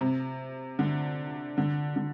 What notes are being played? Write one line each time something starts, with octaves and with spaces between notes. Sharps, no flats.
C3
D3
D3
D3